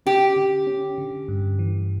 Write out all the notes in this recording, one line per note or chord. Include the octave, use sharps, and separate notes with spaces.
C#4 G4
D3
C#4
D3
G2
E3